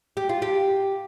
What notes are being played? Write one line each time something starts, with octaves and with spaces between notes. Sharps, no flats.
G4
F4
G4